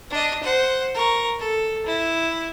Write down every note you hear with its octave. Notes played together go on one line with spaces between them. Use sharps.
D4 D#5
C5 F#5
A#4 C#6
A4
E4